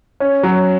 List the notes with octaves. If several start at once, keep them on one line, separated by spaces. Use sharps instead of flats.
C#4
F#3